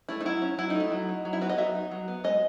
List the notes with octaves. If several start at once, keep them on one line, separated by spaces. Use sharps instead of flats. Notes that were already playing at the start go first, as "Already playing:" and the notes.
A3 E4
D#4
F#3 E4
C#4
F#3 E4
A3 D#4
E4
F#3
D#4
F#3
E4
B3 F#4
D#5
F#3 E5
D#4
F#3
B3
G#3 D#5